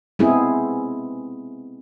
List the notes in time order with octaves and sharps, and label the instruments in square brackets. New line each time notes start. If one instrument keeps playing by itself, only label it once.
[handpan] G#3 B3 C4 E4 G#4